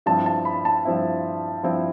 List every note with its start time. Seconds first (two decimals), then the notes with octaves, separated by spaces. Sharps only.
0.06 G2 F3 C4 E4 A5
0.26 A5
0.45 B5
0.65 A5
0.85 G2 F3 C4 E4
1.63 G2 F3 C4 E4